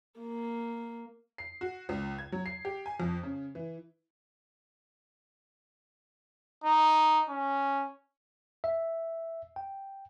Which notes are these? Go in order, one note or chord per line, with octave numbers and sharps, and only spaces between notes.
A#3
C7
F#4
C#2
G#6
F#3
C7
G4
G#5
F2
C#3
E3
D#4
C#4
E5
G5